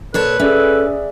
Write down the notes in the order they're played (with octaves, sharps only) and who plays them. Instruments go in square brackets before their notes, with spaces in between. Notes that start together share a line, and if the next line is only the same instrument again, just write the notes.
[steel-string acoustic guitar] A#2 C#5 A5 [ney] A4 [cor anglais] B4
[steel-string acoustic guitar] C#4 [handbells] G#4 D5 E5 [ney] A4